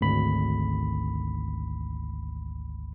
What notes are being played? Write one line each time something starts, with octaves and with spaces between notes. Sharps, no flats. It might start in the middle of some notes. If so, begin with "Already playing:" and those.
G#1 D2 B5